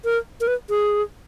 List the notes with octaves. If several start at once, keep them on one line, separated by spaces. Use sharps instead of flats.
A#4
A#4
B4
G#4